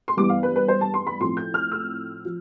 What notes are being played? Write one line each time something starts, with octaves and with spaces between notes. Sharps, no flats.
C6
G2 E3 G3 B3 D6
F5
B4
B4
C5
A5
C6
B5
A2 F3 C4 C6
G6
F6
E6
F3